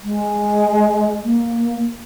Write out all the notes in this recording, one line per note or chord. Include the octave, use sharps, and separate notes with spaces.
G#3
A#3